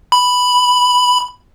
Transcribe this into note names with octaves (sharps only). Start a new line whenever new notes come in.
B5